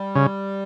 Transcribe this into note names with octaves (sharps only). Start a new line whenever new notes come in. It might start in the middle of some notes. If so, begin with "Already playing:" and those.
Already playing: G3
C#3